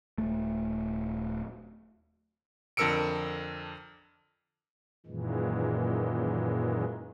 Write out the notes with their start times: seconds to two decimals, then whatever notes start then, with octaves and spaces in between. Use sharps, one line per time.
0.18 D#1 A3
2.77 F2 D3 A#4 E6 C#7 D7
5.06 F#2 A#2 D#3 E3 G#3